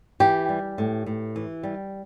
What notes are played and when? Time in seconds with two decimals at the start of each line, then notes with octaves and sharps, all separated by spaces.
0.20 E3 G4
0.49 G3
0.78 A2
1.06 A2
1.36 E3
1.63 G3